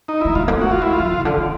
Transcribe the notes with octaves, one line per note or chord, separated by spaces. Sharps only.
D#4
A3 E4
G#3 F4
A#3
A3
F#4
G#3 F4
E4
F4
F#3
C#3
D3
D#3